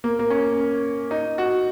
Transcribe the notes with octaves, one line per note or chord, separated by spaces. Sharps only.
A#3
A#3
C#4
D#4
F#4